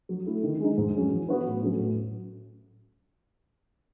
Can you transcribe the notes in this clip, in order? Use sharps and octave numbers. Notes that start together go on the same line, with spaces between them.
F#3
A3 E4
D#3
G#3 D#4
G#2
F#3 C#4 G#4
E3
B3 F#4 B4
A2
F#3 A3 C#4 F#4
A2